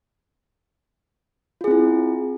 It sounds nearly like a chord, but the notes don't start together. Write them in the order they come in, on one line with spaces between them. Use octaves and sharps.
F4 G#4 C4 E4